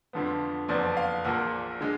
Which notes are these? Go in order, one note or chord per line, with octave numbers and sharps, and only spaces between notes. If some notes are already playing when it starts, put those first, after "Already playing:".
F2 D3 F3 B3
F#1 F2 F3 B3 D5
F5
A#1 A#2 F3 A#3 F#5
D3 G#3